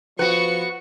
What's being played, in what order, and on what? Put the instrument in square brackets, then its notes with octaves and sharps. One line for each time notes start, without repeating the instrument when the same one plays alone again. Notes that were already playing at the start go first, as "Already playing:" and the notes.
[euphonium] F3 [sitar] B3 F#4 [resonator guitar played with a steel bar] B4 [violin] C#6 C#7